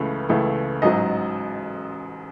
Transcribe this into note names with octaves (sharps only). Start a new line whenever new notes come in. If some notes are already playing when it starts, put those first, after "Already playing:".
Already playing: C#2 C#3 E3 A3 B4
C#2 C#3 E3 A3
A1 G#2 F#3 D#5